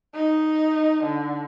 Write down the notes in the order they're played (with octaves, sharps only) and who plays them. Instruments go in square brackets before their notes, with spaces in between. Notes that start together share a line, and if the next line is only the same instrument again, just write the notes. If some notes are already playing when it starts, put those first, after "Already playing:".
[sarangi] D#4
D3